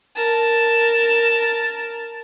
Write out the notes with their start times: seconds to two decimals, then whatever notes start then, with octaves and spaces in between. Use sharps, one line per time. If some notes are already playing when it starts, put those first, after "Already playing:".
0.16 A#4 A5